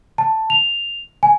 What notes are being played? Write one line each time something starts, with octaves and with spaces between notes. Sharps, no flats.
A5
F7
G#5